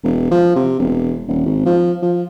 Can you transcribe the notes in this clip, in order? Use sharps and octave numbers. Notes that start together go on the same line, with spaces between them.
E1
F3
C3
E1
D#1
G#1
F3
F3